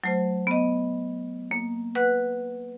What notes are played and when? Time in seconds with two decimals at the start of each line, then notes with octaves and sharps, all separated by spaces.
0.04 F#3 A3 C5
0.47 B3 D#5
1.51 A#3
1.95 B4 F#5 F#6